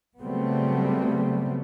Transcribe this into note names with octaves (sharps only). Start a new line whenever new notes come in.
C#3 F#3 G3 A3 B3 C4